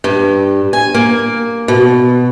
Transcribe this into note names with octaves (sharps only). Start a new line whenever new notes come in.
G2
G#5
A#3
B2